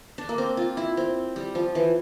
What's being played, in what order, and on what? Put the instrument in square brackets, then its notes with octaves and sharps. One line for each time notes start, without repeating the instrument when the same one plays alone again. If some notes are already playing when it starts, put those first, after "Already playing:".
[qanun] D4
A#3
C4
F4
E4
C4
G3
F3
E3